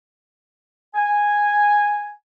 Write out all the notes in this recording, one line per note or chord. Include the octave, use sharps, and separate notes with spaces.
G#5